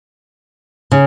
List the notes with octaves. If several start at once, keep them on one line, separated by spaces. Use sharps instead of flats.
C#3